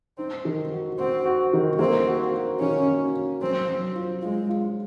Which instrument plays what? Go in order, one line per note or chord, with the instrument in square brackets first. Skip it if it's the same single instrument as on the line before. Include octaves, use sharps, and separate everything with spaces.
[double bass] C4 [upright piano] D#4
[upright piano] D#3
F#4
[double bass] C4 [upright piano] F#4
[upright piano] F#4
D#3
[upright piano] A#3 [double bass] C4
[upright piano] F#4
F#4
[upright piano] D#3 [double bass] C#4
[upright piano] F#4
F#4
[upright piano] F#3 [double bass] C4
[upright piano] F#3
F4
[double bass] G#3 [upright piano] F4
[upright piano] F4